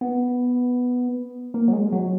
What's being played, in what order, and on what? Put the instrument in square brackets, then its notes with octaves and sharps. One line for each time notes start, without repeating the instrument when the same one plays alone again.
[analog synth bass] B3
A#3
F#3
G#3
F#3